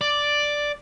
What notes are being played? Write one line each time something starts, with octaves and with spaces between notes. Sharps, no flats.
D5